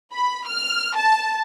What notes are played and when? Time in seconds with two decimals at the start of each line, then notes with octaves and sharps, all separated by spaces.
0.13 B5
0.48 F6
0.96 A5